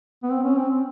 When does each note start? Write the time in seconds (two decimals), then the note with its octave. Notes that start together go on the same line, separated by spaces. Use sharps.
0.23 B3
0.31 C4
0.43 C#4
0.56 C4